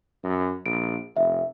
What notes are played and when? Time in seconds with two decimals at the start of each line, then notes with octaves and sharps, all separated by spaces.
0.24 F#2
0.66 A#1 D7
1.17 F1 E5